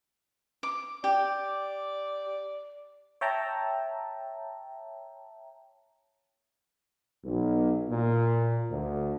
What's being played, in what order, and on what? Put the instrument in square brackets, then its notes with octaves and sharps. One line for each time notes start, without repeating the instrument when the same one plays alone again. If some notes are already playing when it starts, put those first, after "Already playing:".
[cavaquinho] D6
[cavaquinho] G4 [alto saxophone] D5
[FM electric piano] C#5 E5 G5 A5 A#5
[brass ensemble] B1
A#2
D2